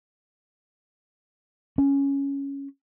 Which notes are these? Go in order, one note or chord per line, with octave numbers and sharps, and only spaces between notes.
C#4